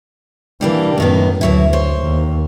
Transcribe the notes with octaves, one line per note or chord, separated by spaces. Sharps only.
E3 G3 A#3 D4 G4
F#2 A2 D#3 B3
D2 B2 F#3 E4
C5 C#5
D#2